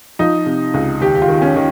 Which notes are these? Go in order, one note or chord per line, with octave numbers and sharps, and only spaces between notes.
F3 D#4
C3
C#2
D#2 G4
G4
F4
D#3
C#4
D#3